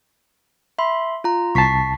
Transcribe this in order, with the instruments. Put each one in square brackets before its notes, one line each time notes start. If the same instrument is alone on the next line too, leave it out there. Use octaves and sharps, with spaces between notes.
[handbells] E5 B5 C6
F4 A#5
[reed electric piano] C2 A5 [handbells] C#6 B6 C7